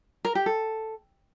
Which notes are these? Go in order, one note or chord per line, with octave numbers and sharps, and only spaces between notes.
A#4
G4
A4